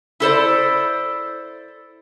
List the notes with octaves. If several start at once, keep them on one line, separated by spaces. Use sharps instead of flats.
E4 A4 C5 D5